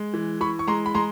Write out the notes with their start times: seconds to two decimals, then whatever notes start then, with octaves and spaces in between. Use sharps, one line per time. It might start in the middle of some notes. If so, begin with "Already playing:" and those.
Already playing: G#3
0.14 E3
0.41 E3 B5 C#6
0.59 C#6
0.67 G#3 A#5 C6
0.86 B5
0.94 G#3 A#5 C6